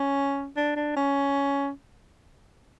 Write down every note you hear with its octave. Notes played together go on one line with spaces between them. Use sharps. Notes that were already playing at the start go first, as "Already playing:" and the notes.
Already playing: C#4
D4
D4
C#4